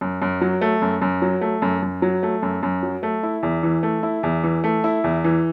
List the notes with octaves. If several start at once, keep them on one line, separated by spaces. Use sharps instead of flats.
F#2
F#2
F#3
A3
F#2
F#2
F#3
A3
F#2
F#2
F#3
A3
F#2
F#2
F#3
A3
E4
E2
E3
A3
E4
E2
E3
A3
E4
E2
E3